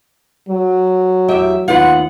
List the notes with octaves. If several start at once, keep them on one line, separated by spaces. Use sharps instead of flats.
F#3
E2 G4 E5
D#2 B3 F4 F#5